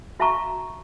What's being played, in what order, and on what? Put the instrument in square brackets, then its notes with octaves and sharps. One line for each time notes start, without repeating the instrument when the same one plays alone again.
[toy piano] F#4 E5 F5 A5 A#5 C#6